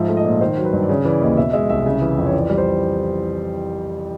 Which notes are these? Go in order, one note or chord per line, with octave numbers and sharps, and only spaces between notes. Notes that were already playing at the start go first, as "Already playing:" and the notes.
Already playing: G#2 F3 E5
A3
D#5
A#2
D#3 C5
F#3
B4
G2
D5
C#3 C#5
E3 D5
D#2 D#5
B2 E5
G#3 E5
C2 E5
C#3
E3
F2
C#5
E3 D5
G3
C5